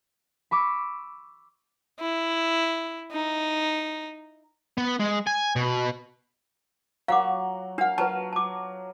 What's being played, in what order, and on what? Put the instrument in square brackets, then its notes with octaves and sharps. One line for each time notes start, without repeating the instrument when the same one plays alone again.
[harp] B5 C#6 D6 E6
[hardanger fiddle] E4
D#4
[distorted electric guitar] B3
G#3
G#5
B2
[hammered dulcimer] F#3 [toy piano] F5 F#5 D6
[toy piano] D4 F#5 [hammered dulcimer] F5
[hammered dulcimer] F#3 [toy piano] B4 A5
[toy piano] A5 D6